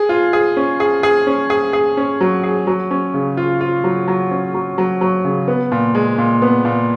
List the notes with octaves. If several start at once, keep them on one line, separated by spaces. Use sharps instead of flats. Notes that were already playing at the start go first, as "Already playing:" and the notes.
Already playing: G#4
F4
G#4
C#4
G#4
G#4
C#4
G#4
G#4
C#4
F#3
G#4
F#3
C#4
C#3
F4
F4
F#3
F#3
C#4
F#3
F#3
F#3
C#3
B3
A#2
G#3
A#2
B3
A#2